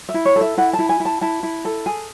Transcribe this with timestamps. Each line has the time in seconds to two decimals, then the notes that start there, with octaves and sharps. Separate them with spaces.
0.09 E5
0.14 E4
0.25 C#5
0.36 A4
0.41 E5
0.58 E4 F#5
0.73 A5
0.79 E4
0.89 G#5
1.00 E4
1.05 A5
1.21 E4 A5
1.43 E4
1.65 A4
1.86 G#4